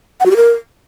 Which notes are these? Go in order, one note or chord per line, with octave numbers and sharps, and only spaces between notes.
F#5
F#4
G4
A#4